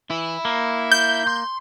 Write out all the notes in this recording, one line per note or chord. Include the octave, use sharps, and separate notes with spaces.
E3 E4
A#3
G6
C6